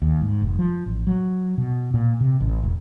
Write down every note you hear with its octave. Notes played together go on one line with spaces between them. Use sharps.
D#2
G#2
F1
F3
A1
F#3
B2
A#2
C3
A1
E1